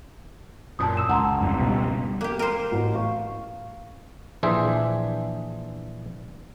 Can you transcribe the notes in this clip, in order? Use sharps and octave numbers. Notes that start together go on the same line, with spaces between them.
F#2 A#2 A5 D#6
E6 E7
C#2 F#5 A#5 C6
F1 G2
B2 G3
A#3 G4
A#4 C5
A1
F5 C#6
A#1 E3 D4 G#4 C5 E5